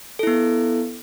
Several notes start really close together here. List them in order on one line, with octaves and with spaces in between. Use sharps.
A4 E4 B3